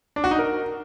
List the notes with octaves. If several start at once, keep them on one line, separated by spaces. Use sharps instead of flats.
D4
F#4
D#4
A#4